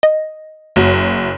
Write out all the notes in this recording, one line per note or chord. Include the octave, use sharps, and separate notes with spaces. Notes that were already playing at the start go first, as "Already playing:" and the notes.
D#5
F#1 F#3